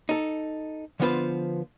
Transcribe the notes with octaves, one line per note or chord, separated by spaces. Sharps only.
D#4 A4
D3 F3 B3 F4 B4 C5